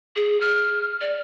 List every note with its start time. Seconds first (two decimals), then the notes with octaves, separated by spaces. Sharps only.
0.16 G#4
0.41 F6
1.01 D5